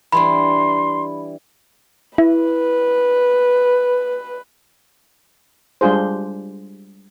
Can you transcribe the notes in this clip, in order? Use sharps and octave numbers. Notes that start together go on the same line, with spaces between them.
E3 G3 D4 B5 C6
E4 B4
G3 G#3 D4 F4 G#4 C5